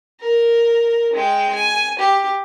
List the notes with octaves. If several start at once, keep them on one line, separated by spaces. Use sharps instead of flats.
A#4
G#3 G5
G#5
G4